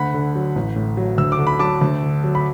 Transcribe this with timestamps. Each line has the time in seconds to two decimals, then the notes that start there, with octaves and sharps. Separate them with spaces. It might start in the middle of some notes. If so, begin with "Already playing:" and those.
Already playing: D2 F#5 B5
0.14 D3
0.35 F#3
0.56 A1
0.76 A2
0.97 F#3
1.18 D2 E6
1.32 D6
1.39 D3
1.47 B5
1.59 F#3 A5 D6
1.82 D2
2.03 D3
2.24 F#3
2.35 B5